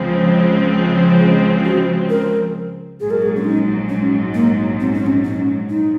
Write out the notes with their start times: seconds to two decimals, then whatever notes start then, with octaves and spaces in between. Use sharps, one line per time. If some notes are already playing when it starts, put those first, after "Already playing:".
Already playing: C#2 C#3 F3 G#3 C4
1.20 G#4
1.65 F#4
2.10 A#4
3.00 A#1 G#2 F#3 G#4
3.11 A#4
3.22 G#4
3.36 C#4
3.44 D#4
3.89 C#4
4.34 A#3
4.80 C4
4.93 C#4
5.06 C4
5.24 C#4
5.70 D#4